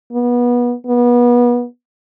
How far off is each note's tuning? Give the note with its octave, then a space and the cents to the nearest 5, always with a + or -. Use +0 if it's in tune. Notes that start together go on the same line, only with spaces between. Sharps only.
B3 -25
B3 -30